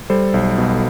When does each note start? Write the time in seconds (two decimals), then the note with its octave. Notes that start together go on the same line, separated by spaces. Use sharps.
0.10 G3 A4 C5
0.34 B1
0.58 B2